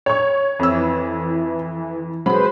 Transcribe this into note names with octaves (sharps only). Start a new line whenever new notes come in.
C#5 C#6
F2 E3 E6
F#3 G#3 B4 C5 B5